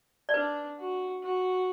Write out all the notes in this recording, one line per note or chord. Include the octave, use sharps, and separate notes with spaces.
D5
D4 B4
F#4
F#4